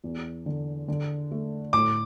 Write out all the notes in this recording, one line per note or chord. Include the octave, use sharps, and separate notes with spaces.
E2
D3
D3
A3
A2 D6